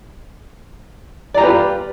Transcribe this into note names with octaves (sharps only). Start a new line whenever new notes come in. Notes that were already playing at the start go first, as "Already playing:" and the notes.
F4 G4 B4 D5 A#5